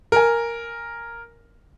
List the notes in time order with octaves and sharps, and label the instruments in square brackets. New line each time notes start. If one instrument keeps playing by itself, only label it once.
[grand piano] A#4 G#5